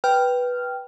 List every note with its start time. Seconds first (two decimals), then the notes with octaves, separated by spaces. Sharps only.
0.04 B4 G5 F6